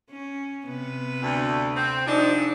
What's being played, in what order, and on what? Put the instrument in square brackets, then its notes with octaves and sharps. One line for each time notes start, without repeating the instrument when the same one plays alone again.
[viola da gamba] C#4
C3 B3 B4
[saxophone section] D2
C4
[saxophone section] F3 G#3 D4 [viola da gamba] D#4 F#4